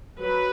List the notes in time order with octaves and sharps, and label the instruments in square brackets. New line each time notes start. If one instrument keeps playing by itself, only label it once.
[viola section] F#3 B4